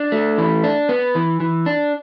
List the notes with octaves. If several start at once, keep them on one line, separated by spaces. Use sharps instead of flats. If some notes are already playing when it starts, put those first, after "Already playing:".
Already playing: D4
A3
E3
D4
B3
E3
E3
D4